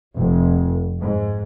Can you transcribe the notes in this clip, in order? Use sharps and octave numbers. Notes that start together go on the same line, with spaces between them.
F1
G#2